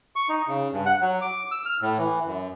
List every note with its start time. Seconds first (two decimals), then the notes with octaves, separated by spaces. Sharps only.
0.16 C#6
0.29 D#4
0.48 C#3
0.73 G2
0.86 F#5
1.01 F#3
1.21 D6
1.51 E6
1.66 F6
1.82 A2
1.99 E3
2.26 F#2